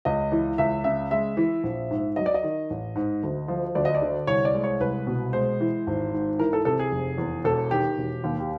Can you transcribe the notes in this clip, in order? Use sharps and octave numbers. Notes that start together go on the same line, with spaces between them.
C#2 D#5
E3
C#2 E5
C#3 E5
G#3 E5
E3
A#1
G#2
F#3 D#5
D5
D#5
D#3
A1
G#2
D2
F3
D2 D5
D#5
D5
D3
C2 C#5
D5
G#3
C#5
C2 B4
B2
G#3 C5
E3
G#1
G#2
E3 A#4
A4
C3 A4
G#4
F1
E2
E1 A4
D#3 G4
E1
D#2
G4